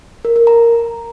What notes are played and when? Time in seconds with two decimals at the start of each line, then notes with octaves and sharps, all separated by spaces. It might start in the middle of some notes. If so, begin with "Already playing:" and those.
0.25 A#4
0.36 A#4
0.47 A#5